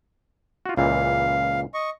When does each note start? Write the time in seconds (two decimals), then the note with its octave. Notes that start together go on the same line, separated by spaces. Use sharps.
0.66 F4 F#4
0.77 C#2 A#2 E3 F5
1.74 D#5 C#6